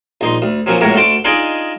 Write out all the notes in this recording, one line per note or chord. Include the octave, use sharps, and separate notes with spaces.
A#1 D#4 C6
D2
F3 F#3 A#3 C#4 F#4
C#2 A2 A#3 F#4 A#4 C#5
D2 A3 F#4 A5 C6 D6
D4 D#4 F4 G#4 D5 D#5